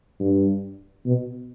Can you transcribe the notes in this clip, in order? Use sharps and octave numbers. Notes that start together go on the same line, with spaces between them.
G2
B2